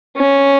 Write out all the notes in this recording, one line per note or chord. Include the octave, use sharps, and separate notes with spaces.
C#4